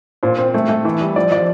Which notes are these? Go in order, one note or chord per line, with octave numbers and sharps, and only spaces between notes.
A#2 C5
C4
A3
A3
E3
G3
F3 D5
F3 D5